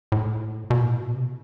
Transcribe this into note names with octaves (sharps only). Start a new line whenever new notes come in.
A2
B2
A2
B2
C3